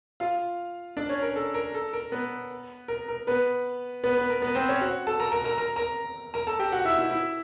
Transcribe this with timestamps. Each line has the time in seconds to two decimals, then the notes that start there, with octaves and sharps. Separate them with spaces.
0.20 F4 F5
0.97 D4 D5
1.09 C#4 C#5
1.22 A#4
1.36 A4
1.54 A#4
1.74 A4
1.93 A#4
2.12 B3 B4
2.88 A#4
3.08 A#4
3.27 B3 B4
4.04 B3 B4
4.17 B3 B4
4.30 A#4
4.42 B3 B4
4.55 C4 C5
4.68 C#4 C#5
4.81 F#4 F#5
5.07 A4 A5
5.20 A#4 A#5
5.32 A#4 A#5
5.44 A#4 A#5
5.58 A#4 A#5
5.76 A#4 A#5
6.34 A#4 A#5
6.47 A4 A5
6.59 G4 G5
6.72 F#4 F#5
6.85 E4 E5
6.99 E4 E5
7.11 E4 E5